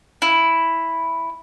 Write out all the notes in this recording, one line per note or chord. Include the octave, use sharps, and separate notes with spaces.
E4